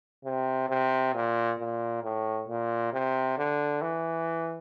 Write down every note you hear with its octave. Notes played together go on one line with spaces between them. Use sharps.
C3
C3
A#2
A#2
A2
A#2
C3
D3
E3